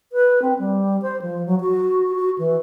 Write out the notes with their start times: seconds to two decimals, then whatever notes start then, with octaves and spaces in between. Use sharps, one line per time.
0.12 B4
0.42 C4
0.59 G3
1.02 C5
1.22 F3
1.46 F#3
1.61 F#4
2.16 F#4
2.38 E3